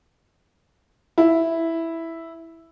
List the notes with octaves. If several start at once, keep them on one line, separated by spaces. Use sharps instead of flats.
E4